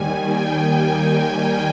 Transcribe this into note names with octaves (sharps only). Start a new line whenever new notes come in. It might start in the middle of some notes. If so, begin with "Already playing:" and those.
Already playing: D#2 D#3 G3 G#5
G5
G#5
G5